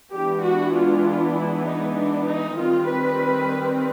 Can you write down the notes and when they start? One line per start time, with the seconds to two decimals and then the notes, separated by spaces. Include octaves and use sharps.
0.13 E3 G#3 B3 D4 G4
0.43 F#4
0.74 F4
1.35 E4
1.65 D#4
1.96 D4
2.27 D#4
2.57 D#3 G3 C4 F4
2.88 B4